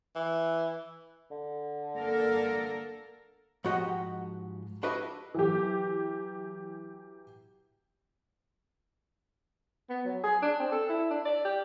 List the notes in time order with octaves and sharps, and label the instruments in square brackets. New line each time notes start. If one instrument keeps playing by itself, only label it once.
[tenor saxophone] E3
[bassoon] D3
[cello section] A#3 A4 A#4
[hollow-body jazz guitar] G#2 F3 F#4 G4 D#5 F#5
D4 E4 F#4 G4 B4 D#5
[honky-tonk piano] E3 F#3 G4
[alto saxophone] B3
F#3
G#4
D4
C4
A4
E4
D4
D5
G4